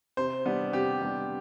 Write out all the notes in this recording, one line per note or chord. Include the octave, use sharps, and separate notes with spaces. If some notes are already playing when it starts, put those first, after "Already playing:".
C3 C5
G3 B3 D4
C3 G4
G3 B3 D4